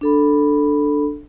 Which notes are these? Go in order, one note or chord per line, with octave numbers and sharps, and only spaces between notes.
D4 A4 B5